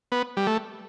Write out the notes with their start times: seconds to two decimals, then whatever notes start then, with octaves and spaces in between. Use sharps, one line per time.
0.12 B3
0.37 G3
0.47 A3